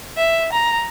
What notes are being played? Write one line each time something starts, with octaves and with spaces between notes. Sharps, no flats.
E5
A#5